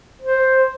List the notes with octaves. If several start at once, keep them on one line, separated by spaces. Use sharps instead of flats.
C5